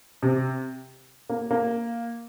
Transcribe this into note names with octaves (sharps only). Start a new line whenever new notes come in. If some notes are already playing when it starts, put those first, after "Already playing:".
C3
A#3
A#3